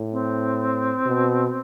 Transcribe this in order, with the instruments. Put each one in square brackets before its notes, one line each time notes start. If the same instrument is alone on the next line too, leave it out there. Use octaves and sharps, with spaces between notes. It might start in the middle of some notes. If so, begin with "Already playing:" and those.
Already playing: [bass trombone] A2
[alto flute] C4
[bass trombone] B2